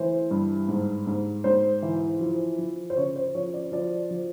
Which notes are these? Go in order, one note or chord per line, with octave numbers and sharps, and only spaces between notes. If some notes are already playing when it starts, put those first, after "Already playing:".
Already playing: E3 A3 C5
G2
G#2
G#2
G#2 C5
E3
F3
F3
C5
C#3 C#5
C5
F3 C#5
D5
F3 D5
F3